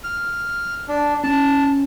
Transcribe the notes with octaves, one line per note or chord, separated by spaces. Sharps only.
F6
D4
C#4 A5